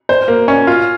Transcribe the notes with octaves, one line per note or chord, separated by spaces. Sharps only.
C5
A#3
C#4
F4